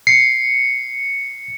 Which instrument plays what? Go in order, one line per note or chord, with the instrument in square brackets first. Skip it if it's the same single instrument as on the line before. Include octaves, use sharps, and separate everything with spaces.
[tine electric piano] C7 [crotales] C#7